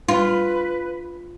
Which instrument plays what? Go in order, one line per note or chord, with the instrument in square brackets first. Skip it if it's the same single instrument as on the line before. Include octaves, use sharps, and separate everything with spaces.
[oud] F4 [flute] B4